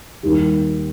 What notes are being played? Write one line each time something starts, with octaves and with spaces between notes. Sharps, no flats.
D#2 D#3 G3